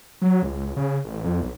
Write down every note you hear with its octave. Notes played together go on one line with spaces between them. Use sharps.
F#3
C#2
C#3
A1
F2
B1